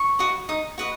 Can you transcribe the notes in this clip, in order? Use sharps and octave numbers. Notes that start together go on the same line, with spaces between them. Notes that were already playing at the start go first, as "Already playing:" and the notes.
Already playing: C#6
F#4 B4 D#5
D#4 D#6
F#4 B4 D#5